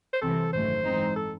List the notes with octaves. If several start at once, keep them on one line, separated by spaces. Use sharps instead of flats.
C5
C2 C3 E3 C4 A4
G#1 F#2 D#3 A3 C5
G#2 E3 C4 D#4
A4